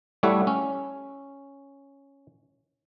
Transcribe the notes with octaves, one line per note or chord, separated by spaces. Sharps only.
G3 A3 E4 C#5 E5 F#5
C#4